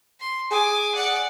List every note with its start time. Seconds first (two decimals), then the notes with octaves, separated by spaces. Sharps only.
0.20 C6
0.51 G#4 G#5 D6
0.95 D5 F#5